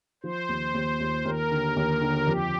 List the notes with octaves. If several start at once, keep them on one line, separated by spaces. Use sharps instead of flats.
F3 C5
D#2
D#2
D#2
D#2 A#4
D3
D#2
D3
F2 G4